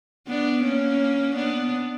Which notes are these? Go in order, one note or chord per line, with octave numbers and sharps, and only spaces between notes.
B3 D4
A#3 C#4
B3 D4